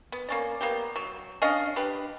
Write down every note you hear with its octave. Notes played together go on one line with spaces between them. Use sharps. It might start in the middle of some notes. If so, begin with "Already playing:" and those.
B3
A#3 C#4 D5
A#3 B3 G4
F#3
C#4 D4 D#5 F5
D4 G4 B4